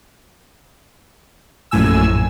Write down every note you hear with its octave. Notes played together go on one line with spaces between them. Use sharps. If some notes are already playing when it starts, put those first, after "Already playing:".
A#1 F#2 A2 G#5 E6